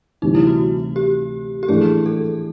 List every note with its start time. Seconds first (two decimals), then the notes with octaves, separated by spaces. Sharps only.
0.22 D2 C3 E3 G3 D#4
0.35 E4
0.47 F#4
0.96 G4
1.63 G4
1.68 A2 E3 A3 D4 G#4
2.06 A4